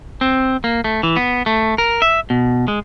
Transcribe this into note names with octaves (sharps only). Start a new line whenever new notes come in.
C4
A#3
A3
E3
B3
A3
A#4
E5
B2
G#3